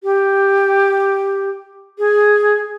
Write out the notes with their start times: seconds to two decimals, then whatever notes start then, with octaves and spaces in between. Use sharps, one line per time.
0.04 G4
1.99 G#4